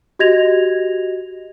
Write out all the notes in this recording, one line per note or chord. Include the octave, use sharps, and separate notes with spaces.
F#4 G4 D#5 G#6 A#6 F7